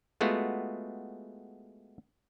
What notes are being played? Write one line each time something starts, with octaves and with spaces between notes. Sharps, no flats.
G#3 A3 B3 F4 F#4